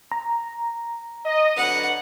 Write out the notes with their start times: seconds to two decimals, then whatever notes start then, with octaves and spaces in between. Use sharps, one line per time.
0.12 A#5
1.25 D#5
1.57 D3 F#3 B4 F#5